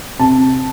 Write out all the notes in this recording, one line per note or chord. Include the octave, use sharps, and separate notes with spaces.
C3 A5